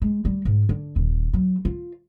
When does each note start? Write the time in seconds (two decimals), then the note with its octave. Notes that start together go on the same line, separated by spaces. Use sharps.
0.02 G#3
0.25 G3
0.45 G#2
0.69 D3
0.96 D#1
1.33 F#3
1.65 F4